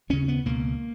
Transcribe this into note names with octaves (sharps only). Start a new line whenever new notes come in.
D#2 C#3 C#4
B3
C#2 B2 A#3